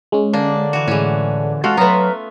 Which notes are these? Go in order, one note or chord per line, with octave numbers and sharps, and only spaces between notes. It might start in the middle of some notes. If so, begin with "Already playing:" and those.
G#3 C#4
D3 A#3 D4
E3 F#4
A2 E3 G#3 C#4
G#3 F4 F#4 A4 C6 F6
F#3 A3 B3 B4 A#5